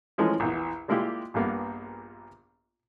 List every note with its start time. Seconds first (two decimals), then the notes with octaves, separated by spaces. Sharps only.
0.18 E3 F3 G#3 A3 C#4 A#4
0.40 A#1 E2
0.88 G3 G#3 A#3 E4 F4 G4
1.34 A#1 G2 A#3 B3